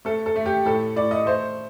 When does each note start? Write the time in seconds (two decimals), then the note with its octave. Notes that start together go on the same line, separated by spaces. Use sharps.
0.05 A3 A4
0.26 A4
0.36 A3
0.46 G4
0.65 A2 A4
0.96 A2 D5
1.11 D#5
1.26 A3 C5